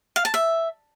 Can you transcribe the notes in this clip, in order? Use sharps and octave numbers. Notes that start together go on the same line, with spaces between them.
F5
A5
E5